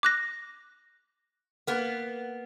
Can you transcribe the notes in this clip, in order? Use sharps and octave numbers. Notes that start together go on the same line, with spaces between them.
D6 F#6 A#6
A#3 B3